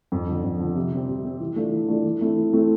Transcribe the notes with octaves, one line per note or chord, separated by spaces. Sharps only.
F2
D3 F3
F2
D3 F3
C3
G3 C4 G4
C3
G3 C4 G4
E3
A3 D4 F4
E3
A3 D4 F4
E3
A3 C4 E4
E3
A3 C4 E4